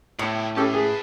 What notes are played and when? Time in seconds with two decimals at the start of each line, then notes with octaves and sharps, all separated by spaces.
0.19 A2 E4 G4
0.56 C#4 G4 A4 B4 A5
0.73 G#4